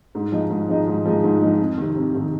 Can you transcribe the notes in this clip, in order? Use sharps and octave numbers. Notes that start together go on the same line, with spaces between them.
G#2
F3 G#3 D#4
G#2
F3 G#3 D#4
G#2
F3 G#3 D#4
G#2
F3 G#3 D#4
F2
C3 D#3
F2
C3 D#3